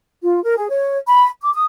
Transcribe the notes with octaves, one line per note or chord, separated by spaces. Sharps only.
F4
A#4
G#4
C#5
B5
D6
D#6